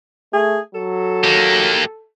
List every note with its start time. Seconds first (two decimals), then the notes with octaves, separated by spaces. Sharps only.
0.33 A3 G#4
0.75 F#3 A4
1.24 A#3 G4